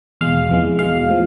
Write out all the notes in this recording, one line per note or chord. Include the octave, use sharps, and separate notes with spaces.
E2 B2 G#3 F5
F2 E3 G#3
E2 B2 G#3 F5
A2 F3